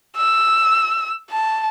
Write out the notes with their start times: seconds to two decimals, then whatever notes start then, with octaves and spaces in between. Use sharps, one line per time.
0.17 E6
1.31 A5